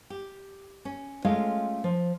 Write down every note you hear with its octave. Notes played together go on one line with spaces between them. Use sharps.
G4
C#4
G#3 A3 C#4 F4 D#5 F5
F3